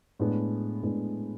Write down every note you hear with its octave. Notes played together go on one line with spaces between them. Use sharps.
A2 G#3 B3 D4
A2 G#3 B3 D4